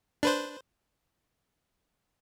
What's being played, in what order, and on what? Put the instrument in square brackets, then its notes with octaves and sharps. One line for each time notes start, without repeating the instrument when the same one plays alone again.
[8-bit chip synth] D4 B4 C5